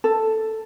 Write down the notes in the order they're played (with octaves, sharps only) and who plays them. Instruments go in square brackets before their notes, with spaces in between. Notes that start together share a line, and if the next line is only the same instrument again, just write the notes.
[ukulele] A4